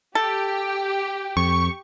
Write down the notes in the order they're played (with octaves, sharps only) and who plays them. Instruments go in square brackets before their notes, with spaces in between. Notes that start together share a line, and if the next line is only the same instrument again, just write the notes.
[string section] G4 [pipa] A4
[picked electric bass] F2 [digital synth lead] C#6